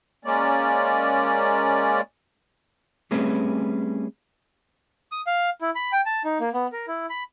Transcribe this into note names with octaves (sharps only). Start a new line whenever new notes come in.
G#3 A#3 C#4 D5
G3 A3 C4 C#4 G#4 B4
D#6
F5
E4
B5
G5
A5
D#4
A#3
B3
A#4
E4
B5